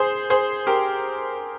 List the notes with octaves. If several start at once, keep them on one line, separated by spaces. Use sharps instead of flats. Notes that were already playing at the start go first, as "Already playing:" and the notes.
Already playing: G#4 C5
G#4 C5
G4 A#4